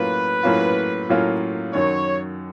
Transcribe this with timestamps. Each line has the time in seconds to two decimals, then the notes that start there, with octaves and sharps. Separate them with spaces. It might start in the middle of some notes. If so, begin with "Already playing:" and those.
Already playing: A2 F#3 A#3 C#4 F4 B4
0.43 A2 F#3 A#3 C#4 F4
1.09 A2 F#3 A#3 C#4 F4
1.73 F#2 D#3 F#3 C#5